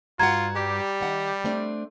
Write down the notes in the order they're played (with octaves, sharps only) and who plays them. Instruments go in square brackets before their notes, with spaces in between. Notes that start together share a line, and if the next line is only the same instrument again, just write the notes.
[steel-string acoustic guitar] G2 F#4 F#5 [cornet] F4 [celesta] A#5 G#6
[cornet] G3 [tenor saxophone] G4
[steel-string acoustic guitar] D#3 F#5
A3 C4 D4